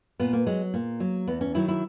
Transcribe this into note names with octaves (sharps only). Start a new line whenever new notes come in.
A#2 B3
A#3
F#3 G#3
A#2 A#3
F#3
E2 B3
C#4
D#3 F#3 E4
E4